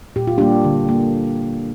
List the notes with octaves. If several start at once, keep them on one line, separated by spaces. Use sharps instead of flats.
A#2 G4
F4
G3 A#3 D4 G4
D3
A#3